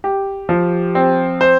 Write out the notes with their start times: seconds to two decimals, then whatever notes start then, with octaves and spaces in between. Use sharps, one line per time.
0.04 G4
0.49 F3
0.95 C4
1.41 C5